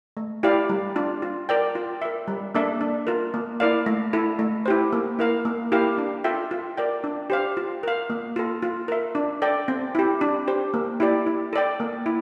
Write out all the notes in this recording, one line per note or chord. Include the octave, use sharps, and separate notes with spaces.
A3
E4 G4 D5 F5
G3
D4 F4
F4
A#4 D5 G5
F4
A#4 E5
G3
A#3 D4 A4 E5
D4
F4 A#4
A#3
E4 A#4 D5 F5
A3
E4 A4
A3
E4 G4 C5
A#3
E4 A#4 F5
A#3
E4 G4 A#4 F5
D4
F4 A4 E5 G5
F4
A#4 D5 G5
D4
G4 C5 F5
F4
A#4 F5
A#3
F4 A4
F4
A#4 E5
D4
A4 D5 G5
C4
E4 G4
D4
G4 C5
A#3
E4 G4 D5
E4
A4 D5 G5
A#3
E4